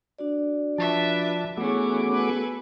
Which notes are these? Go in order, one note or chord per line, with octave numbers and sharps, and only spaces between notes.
D4 F#4 D5
F3 B4 E5 A5 D6
E3 A3 B3 C#4 E4 F#4 G#4 D6
A4 B4 G#5